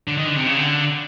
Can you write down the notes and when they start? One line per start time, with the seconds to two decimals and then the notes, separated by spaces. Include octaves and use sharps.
0.08 D3
0.17 D#3
0.26 D3
0.37 C3
0.47 C#3
0.56 D3